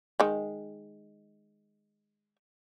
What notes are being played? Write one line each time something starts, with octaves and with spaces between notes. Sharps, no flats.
D#3 G#3